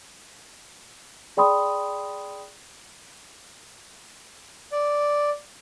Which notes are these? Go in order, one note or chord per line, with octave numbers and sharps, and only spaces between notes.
G#4 D5 G5 B5 C6 D#6
D5